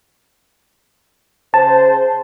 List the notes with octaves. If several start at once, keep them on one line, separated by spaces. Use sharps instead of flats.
C#3 G#4 C5 A5